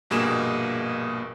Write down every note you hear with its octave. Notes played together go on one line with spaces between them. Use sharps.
A#1 G2 B2 A#3 G#4 E7